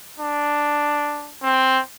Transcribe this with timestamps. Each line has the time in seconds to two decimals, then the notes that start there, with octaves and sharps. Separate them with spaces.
0.20 D4
1.43 C4